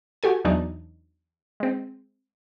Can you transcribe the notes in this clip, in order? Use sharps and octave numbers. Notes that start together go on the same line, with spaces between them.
F#4 G4 A4 G#5
E2 E3 F#3 D4 D#4
G#3 C4